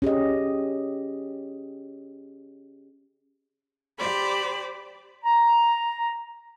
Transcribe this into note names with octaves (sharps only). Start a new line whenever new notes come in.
C#4 G4 G#4 D#5
G4 C5 D5 B5
A#5